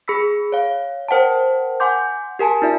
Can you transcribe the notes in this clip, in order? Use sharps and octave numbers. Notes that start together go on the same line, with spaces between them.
G#4 B5 E6 B6
C#5 F5
A#4 C5 F#5 G5 A5
F#5 G#5 C6 D6 G6
G4 A#4 G#5 A5
D#4 F4 D5 E5